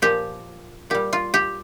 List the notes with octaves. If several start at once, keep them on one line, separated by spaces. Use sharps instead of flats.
A#2 F3 G4
A#2 G3 G4
F4
G4